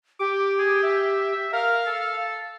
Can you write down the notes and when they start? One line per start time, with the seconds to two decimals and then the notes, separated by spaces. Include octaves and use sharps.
0.20 G4 D6
0.59 G#4
0.83 E5
1.53 A#4 F5
1.87 A4